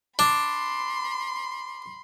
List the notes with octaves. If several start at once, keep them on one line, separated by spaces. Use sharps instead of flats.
D4 B5 C6